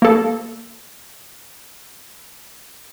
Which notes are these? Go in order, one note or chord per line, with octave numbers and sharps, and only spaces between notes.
A#3 A4